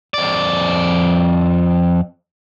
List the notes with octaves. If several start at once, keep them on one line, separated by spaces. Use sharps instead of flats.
F2 D5